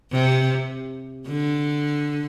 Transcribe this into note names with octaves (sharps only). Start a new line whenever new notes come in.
C3
D3